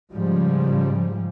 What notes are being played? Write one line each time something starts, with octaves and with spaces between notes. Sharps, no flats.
G#2 C#3 F3 G3